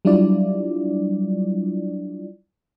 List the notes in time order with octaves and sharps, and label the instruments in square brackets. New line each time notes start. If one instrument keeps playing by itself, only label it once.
[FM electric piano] F#3 G3 D4 E4 F4 D5